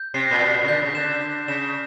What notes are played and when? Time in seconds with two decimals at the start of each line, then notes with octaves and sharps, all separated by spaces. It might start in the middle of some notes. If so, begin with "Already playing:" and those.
Already playing: G6
0.14 C3 C7
0.31 A#2
0.41 B2 C7
0.54 A#2
0.63 C#3
0.68 D3 G6
0.81 C#3
0.95 D3 E7
1.21 G6
1.48 C#3 E7